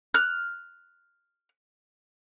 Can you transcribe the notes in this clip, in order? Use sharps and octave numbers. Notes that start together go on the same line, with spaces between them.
F6 F#6